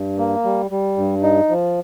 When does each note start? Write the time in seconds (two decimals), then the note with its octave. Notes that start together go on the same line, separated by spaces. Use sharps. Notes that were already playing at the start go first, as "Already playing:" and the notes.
Already playing: G2
0.18 A#3
0.44 G3
0.71 G3
0.97 G2
1.23 D#4
1.49 F3